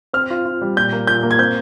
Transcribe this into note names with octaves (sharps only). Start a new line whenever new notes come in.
C4 F6
F4
F4
G3
A#2 G6
A#3
A#2 G6
A#3
G#6
C4 G6